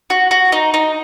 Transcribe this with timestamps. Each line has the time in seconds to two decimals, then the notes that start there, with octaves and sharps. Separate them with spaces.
0.10 F#4
0.31 F#4
0.52 D#4
0.74 D#4